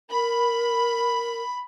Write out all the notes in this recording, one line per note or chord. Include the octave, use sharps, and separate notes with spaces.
A#4 B5